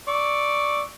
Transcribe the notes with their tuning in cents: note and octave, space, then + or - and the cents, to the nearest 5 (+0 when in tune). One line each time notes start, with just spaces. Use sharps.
D5 +0 C#6 +0 E6 -20